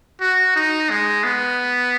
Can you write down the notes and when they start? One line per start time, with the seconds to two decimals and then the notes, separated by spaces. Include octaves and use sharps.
0.21 F#4
0.56 D#4
0.90 G#3
1.24 B3